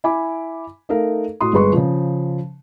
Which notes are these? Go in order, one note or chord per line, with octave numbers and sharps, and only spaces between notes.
E4 G#5 B5 D6
A3 D#4 A4 A#4 F5
A2 F#4 C6 D#6
G1 G#3 G#4 B4 C6 C#6
C#3 F3